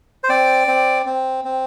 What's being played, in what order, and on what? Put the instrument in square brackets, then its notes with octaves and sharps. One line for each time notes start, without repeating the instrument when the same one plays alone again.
[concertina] C5
C4 D5
C4
C4
C4